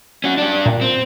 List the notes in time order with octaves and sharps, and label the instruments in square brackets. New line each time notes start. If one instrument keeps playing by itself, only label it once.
[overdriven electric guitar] C#4 F#4
D4 G4
[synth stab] A#2
[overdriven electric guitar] C4